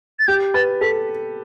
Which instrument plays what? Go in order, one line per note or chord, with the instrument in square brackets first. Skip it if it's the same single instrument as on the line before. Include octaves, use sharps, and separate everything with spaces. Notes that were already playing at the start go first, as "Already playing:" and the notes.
[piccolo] A6
[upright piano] G4 [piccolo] G6
[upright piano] B4 [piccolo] A6
[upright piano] A4 [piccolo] B6